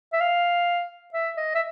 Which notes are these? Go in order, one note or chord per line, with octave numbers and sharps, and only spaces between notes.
E5
F5
E5
D#5
E5